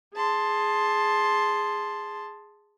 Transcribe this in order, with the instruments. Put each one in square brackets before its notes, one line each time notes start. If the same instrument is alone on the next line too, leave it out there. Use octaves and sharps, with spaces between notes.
[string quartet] G#4 A5 C6